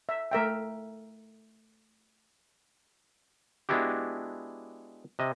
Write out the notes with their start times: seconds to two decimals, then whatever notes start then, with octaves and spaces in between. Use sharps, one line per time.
0.09 E5
0.31 A3 A#4 E5 G5
3.69 G#3 B3 D4 E4 F#4 G4
5.19 C3 D#5